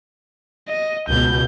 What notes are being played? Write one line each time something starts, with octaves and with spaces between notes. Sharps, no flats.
D#5
C#2 B2 G6